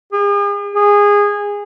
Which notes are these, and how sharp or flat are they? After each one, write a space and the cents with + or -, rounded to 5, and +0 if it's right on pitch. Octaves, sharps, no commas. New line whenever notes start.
G#4 -45
G#4 -20